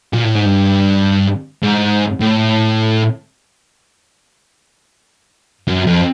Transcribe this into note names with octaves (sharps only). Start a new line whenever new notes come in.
A#2
A2
G#2
G2
G#2
A2
F#2
F2